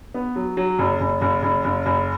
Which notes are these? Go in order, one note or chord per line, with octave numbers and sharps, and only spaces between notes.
B3
F#3
F#3
F#1
F#1
F#1
F#1
F#1
F#1